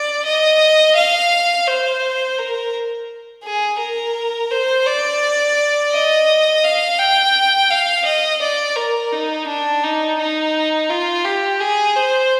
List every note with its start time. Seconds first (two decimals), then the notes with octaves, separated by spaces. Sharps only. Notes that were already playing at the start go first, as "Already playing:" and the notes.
Already playing: D5
0.25 D#5
0.96 F5
1.67 C5
2.38 A#4
3.44 G#4
3.79 A#4
4.51 C5
4.86 D5
5.92 D#5
6.64 F5
6.98 G5
7.70 F5
8.05 D#5
8.42 D5
8.76 A#4
9.12 D#4
9.47 D4
9.84 D#4
10.18 D#4
10.90 F4
11.24 G4
11.61 G#4
11.96 C5